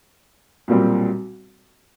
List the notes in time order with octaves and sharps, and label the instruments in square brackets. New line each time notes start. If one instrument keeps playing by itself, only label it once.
[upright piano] B1 A#2 G3 C4